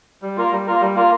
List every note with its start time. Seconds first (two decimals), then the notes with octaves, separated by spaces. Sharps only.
0.22 G3
0.37 A#3 F4 A#4
0.52 G3
0.67 A#3 F4 A#4
0.81 G3
0.95 A#3 F4 A#4